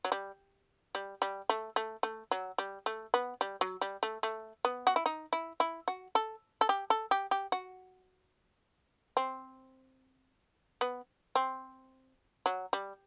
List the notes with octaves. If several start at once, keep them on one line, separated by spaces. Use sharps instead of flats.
F#3
G3
G3
G3
A3
A3
A3
F#3
G3
A3
B3
G3
F#3
G3
A3
A3
B3
F#4
E4
D#4
E4
E4
F#4
A4
A4
G4
A4
G4
G4
F#4
C4
B3
C4
F#3
G3